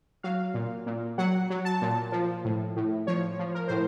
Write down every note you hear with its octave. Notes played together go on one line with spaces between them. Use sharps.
F#3 F5
A#2
A#2
F#3 F#5
F#3
A5
A#2
F3
A2
A2
F3 C#5
F3
A#4
A2 C5